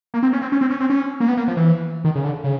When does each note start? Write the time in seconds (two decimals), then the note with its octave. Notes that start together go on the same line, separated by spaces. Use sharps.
0.14 A#3
0.23 C4
0.33 C#4
0.42 C4
0.52 C#4
0.61 C4
0.70 C#4
0.80 C4
0.90 C#4
1.20 A#3
1.28 B3
1.37 A#3
1.48 F3
1.57 E3
2.04 D#3
2.15 C#3
2.25 D3
2.44 C#3